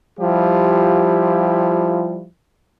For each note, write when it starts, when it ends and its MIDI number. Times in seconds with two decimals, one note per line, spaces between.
0.20 2.26 53
0.20 2.26 55
0.20 2.26 64
0.20 2.26 65
0.20 2.26 67